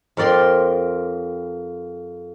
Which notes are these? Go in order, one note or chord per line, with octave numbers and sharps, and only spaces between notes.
F2 A#4 D5 G5 C6